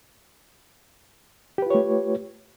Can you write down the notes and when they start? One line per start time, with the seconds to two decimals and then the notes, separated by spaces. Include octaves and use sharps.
1.58 G4
1.62 B4
1.66 F4
1.70 C#5
1.75 A3